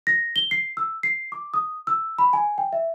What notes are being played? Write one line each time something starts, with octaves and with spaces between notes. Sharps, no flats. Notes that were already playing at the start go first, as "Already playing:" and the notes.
A#6
G7
C7
E6
C7
D6
D#6
E6
B5
G#5
G5
E5